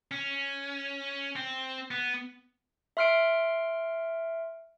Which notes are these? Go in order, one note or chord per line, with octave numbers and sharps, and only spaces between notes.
C#4
C4
B3
E5 C6 F6 C7 D7